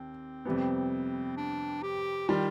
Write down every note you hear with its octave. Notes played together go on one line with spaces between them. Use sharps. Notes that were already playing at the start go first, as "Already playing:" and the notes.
Already playing: D#2 C4
F2 C3 G3 B3
D4
G4
D#3 G3 F4